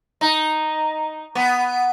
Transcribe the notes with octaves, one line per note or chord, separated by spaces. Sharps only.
D#4
B3